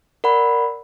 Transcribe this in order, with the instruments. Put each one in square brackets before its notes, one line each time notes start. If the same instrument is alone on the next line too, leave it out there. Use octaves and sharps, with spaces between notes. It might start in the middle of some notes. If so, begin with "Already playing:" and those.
[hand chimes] A#4 D5 F#5 B5